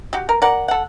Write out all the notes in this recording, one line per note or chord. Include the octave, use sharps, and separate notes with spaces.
F#4 G4
A#4
A#4 D5 F#5
A4 F#5